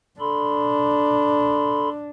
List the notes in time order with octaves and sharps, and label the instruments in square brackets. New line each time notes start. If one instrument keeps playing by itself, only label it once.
[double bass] D4 [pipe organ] A4 B5 C6